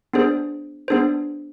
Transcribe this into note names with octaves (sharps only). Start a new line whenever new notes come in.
B3 D4 G#4 C5
B3 D4 G#4 C5